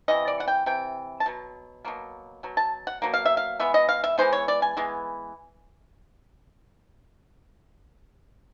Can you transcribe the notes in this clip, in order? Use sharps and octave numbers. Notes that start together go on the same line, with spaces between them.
C3 E3 D#5
D5
F#5
G5
C3 E3 G5
A5
B2 F#3
B2 F#3 A#3
B2 F#3
A5
F#5
B2 F#3 A#3
F5
E5
F5
E3 G#3 B3 E5
D#5
F5
E5
E3 G#3 B3 C5
C#5
D5
G#5
E3 G#3 B3